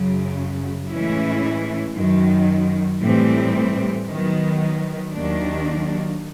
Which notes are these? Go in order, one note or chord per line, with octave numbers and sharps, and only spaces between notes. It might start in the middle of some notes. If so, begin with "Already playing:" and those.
Already playing: F#2 C#3 F#3
A2 E3 G#3 C#4 E4
F#2 D#3 F#3
A2 E3 G3 C4
D#3 F#3 B3
D#2 D#3 F#3 A#3 D4